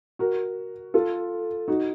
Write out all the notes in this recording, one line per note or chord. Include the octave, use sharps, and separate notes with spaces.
F#4 A#4
F4 A4
D#4 F#4